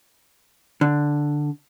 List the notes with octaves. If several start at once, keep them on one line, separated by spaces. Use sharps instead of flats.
D3